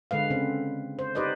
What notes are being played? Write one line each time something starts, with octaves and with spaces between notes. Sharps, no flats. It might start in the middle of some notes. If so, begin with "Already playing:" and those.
D3 G#3 B4 F5
C#3 C4
C5
D#4 G4 B4 C5 D5 D#5